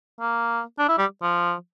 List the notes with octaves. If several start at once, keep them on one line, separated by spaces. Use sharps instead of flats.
A#3
D4
E4
G3
F3